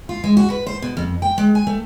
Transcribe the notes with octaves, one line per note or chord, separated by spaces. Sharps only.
F4
G#3
F#4
B4
C5
B2
F2
G5
G#3
G#5
A3